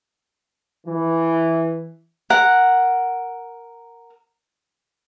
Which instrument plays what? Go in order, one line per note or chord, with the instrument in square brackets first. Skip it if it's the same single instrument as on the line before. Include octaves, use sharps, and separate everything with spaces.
[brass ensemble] E3
[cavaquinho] A#4 F#5